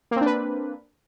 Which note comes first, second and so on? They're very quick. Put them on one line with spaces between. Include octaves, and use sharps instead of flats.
A#3 C4 D4 B4